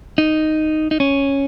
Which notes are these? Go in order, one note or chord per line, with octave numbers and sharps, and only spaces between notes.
D#4
D#4
C#4